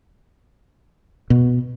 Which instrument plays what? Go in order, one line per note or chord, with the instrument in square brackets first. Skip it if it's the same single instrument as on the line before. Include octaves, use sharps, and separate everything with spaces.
[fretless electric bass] B2